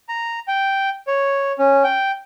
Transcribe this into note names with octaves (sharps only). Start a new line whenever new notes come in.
A#5
G5
C#5
C#4
G5